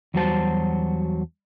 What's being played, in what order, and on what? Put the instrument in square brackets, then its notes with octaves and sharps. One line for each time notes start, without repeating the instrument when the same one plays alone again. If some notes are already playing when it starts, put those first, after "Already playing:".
[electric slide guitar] E2 F#3 G3 F#4 C5 A5